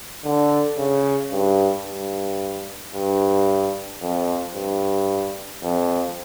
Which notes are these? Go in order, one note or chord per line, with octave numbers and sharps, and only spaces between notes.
D3
C#3
G2
G2
G2
F2
G2
F2